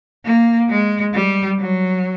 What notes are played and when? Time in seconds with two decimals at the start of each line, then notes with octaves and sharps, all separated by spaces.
0.25 A#3
0.70 G#3
1.14 G3
1.59 F#3